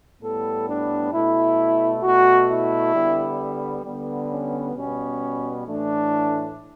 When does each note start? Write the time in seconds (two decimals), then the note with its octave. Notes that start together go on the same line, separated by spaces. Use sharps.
0.22 A2 G3 B3 A4
0.68 D4
1.12 B2 A3 E4
2.03 B2 A3 F#4
2.49 E4
2.95 D3 G3 B3
3.85 D3 G3 B3
4.31 C#4
4.76 B2 G3 B3 C#4
5.66 A2 E3 A3 D4